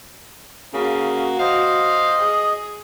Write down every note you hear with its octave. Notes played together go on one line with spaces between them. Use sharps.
C#3 A#3 F#4
C5 D#5 F5
G#4